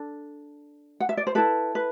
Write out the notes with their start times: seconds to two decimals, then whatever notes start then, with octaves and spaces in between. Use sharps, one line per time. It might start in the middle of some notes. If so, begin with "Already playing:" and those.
Already playing: D4 A4
1.00 F#5
1.09 E5
1.17 D5
1.27 C5
1.35 E4 A4 B4
1.75 B4